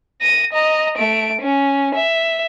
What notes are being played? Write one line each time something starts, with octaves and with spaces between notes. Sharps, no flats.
A#6 D#7
D#5 A#5
A3 D7
C#4
E5